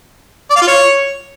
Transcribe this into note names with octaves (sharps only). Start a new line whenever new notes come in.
D5
F5
F4
C#5